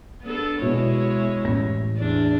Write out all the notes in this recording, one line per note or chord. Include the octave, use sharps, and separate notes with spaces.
B3 D4 A4
B2 G#3 E4 C#5
A1 A#6
E2 A3 D4